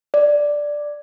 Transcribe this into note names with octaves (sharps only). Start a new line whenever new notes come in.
D5